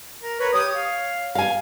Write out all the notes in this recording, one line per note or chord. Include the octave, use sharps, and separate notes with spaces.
A#4
A#4 B4 C#5
G4 C#5 D#6
F5
F5 G#5